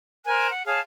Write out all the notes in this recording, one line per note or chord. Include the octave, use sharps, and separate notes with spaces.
A#4 C5 G#5 F#6
F#5
G#4 C#5 F5 A5